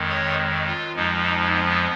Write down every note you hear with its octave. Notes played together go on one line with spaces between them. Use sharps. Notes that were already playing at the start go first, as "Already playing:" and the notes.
Already playing: F2 D#3 G#3
C#5
F4
F2 F3 G#3 D#4
B3